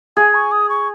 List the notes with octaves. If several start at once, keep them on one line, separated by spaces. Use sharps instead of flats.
G#4 G#5
C#6
D#6
C#6